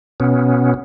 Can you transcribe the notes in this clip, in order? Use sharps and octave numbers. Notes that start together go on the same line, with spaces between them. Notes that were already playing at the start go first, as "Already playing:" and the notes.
B2 B3 C#4